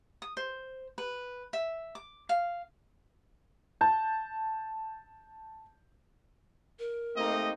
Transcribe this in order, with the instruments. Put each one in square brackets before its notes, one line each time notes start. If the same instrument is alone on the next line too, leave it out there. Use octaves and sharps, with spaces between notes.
[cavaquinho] D#6
C5
B4
E5
D6
F5
[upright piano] A5 G6
[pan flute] A#4
[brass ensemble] A3 G4 [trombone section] A#3 C4 D#4 [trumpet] D#5